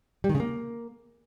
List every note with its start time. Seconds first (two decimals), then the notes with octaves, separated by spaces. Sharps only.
0.24 G3
0.29 D#3
0.35 C#3
0.40 A#3